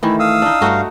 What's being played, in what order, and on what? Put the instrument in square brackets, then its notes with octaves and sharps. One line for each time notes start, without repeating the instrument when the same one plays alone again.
[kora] D#3 E3 [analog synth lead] A3 [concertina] E4
[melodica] F5 [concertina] D#6 E6
[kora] D4 D#4
[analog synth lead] G2 [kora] A3 D#4 F#4